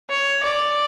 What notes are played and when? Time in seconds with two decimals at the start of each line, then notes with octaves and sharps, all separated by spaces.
0.10 C#5
0.43 D5